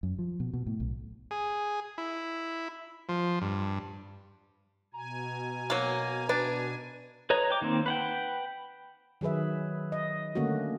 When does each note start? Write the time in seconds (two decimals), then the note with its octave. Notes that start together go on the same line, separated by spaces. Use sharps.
0.03 F#2
0.19 F3
0.40 B2
0.53 B2
0.67 A2
0.80 B1
1.31 G#4
1.98 E4
3.09 F3
3.42 G2
4.94 B2 G#5 A#5
5.70 F#3 A#3
6.29 D4 B4
7.30 B4 C#5 D#5 A#5
7.50 G5 D6
7.62 D#3 A#3 C4
7.86 B4 F#5 G5
9.21 D#3 F#3 G#4 B4 E5
9.92 D#5
10.35 D3 A3 A#3 C#4 F#4